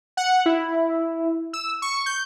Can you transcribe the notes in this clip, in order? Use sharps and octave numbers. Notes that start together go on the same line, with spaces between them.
F#5
E4
E6
C#6
G6